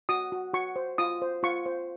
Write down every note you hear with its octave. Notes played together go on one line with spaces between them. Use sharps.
F#4 D#6
F#4
F#4 C#6
C5
F4 D#6
C5
F4 C#6
C5